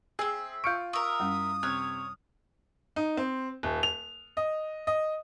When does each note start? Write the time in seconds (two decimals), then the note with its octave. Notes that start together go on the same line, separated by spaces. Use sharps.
0.19 C4 G#4 E5
0.64 F4 C#6 F6 G6 C#7 D7
0.93 A#4 E5 C#6 D#6
1.20 F#2 G3 C#4
1.63 C3 C#5 F6 F#6
2.96 D#4
3.17 C4
3.63 D#1
3.83 F7
4.37 D#5
4.87 D#5